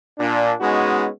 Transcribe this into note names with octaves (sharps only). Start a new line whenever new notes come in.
A#2 D4
G#3 B3 C#4 D#4 F#4